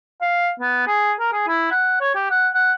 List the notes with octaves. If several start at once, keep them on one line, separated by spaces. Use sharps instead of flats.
F5
B3
G#4
A#4
G#4
E4
F#5
C#5
G4
F#5
F#5